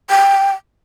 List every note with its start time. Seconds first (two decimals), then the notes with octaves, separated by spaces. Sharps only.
0.10 G5